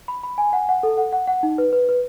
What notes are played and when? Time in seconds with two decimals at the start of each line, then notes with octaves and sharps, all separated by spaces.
0.08 B5
0.23 B5
0.38 G#5
0.53 F#5
0.69 F#5
0.83 A4
0.98 F#5
1.13 F#5
1.27 F#5
1.43 D#4
1.58 B4
1.73 B4
1.89 B4